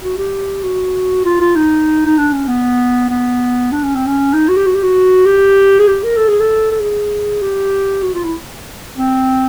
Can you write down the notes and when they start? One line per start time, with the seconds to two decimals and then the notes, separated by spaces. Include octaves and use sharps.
0.02 F#4
0.17 G4
0.64 F#4
1.25 F4
1.41 F4
1.56 D#4
2.06 D#4
2.18 D4
2.33 C#4
2.48 B3
3.10 B3
3.72 D4
3.83 C#4
3.95 C4
4.07 C#4
4.34 D#4
4.48 F#4
4.57 G4
4.67 F#4
4.75 G4
4.83 F#4
5.26 G4
5.79 G#4
5.87 G4
6.04 A#4
6.16 A4
6.28 G#4
6.41 A4
6.71 A4
6.80 G#4
7.41 G4
8.03 F#4
8.14 F4
8.24 E4
8.96 C4